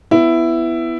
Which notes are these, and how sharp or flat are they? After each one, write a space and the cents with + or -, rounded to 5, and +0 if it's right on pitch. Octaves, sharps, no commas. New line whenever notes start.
B3 +10 E4 +10